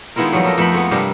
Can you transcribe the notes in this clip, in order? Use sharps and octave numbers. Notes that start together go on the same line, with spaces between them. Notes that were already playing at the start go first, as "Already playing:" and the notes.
D#3 G#3 B3 E4 F4 A#4
F2 F#3 G3 A3 B3
F4 A4 A#4 D#5
F2 A3 B3 G5 B5
G#3 A3 B3
G2 C3 G3 A#4